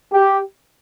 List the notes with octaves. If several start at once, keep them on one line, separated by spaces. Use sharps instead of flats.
G4